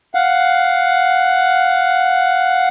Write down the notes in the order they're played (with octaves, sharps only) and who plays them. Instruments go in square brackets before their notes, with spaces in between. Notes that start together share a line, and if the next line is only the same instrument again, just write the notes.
[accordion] F5 F#5